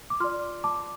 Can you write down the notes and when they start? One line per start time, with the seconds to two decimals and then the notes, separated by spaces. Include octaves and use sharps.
0.10 D6
0.20 F4 D5 C6 F6
0.64 A5 D6